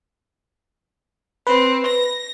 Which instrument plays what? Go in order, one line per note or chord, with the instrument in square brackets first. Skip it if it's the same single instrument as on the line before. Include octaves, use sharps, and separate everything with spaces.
[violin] C4 [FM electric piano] B4
[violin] A#6